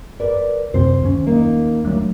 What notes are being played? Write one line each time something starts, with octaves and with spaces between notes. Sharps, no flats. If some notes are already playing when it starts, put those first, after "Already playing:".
A#4 B4 D5
F#2 C3 C4 C5
D#2 C#4
A#3 D#4
F#3 A3 D4